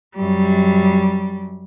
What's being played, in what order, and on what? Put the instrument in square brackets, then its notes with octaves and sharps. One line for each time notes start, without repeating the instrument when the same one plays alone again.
[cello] F#2 G3